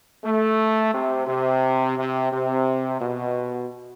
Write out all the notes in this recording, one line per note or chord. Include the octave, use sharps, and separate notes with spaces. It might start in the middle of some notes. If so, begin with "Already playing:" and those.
A3
C3
C3
C3
C3
B2